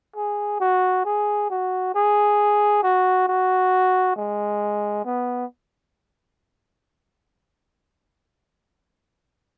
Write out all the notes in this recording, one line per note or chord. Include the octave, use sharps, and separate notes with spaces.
G#4
F#4
G#4
F#4
G#4
F#4
F#4
G#3
B3